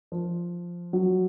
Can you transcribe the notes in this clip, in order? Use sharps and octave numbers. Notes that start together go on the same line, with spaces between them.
F3
F#3